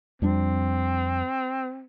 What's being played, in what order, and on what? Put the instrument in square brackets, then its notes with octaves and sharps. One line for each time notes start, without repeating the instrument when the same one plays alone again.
[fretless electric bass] F2 G3 D4 [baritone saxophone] C4